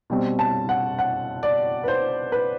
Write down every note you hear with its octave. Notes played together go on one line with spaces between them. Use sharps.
B2 G3 C4
A5
F#5
F#5
D5
B4
C5
B4